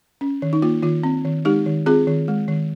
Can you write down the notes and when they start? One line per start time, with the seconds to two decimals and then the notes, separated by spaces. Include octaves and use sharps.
0.21 C#4
0.42 D#3
0.53 D#4
0.62 A#3 F4
0.82 D#3 F4
1.03 C4
1.25 D#3
1.45 G#3 D#4 G4
1.66 D#3
1.86 C4 F4 G#4
2.07 D#3
2.28 G#3
2.48 D#3